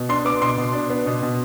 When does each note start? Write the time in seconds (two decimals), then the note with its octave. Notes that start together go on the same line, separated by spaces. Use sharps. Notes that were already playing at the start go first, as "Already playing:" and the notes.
Already playing: B2
0.09 D4 C6
0.25 B3 D6
0.42 B2 C6
0.58 B2
0.73 D4
0.90 B3
1.06 B2
1.22 B2